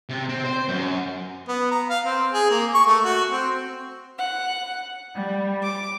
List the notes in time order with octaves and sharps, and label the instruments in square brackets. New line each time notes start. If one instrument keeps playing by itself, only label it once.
[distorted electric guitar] C3
C4
C5
F#2
[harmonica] B3
A#5
F5
C4
G#4
A#3
C#6
A3
F#4
C4
[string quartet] F#5
G3
D6